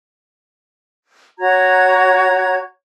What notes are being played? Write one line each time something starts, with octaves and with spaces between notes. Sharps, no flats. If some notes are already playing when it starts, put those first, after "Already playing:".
F#4 C#5 A#5 G#6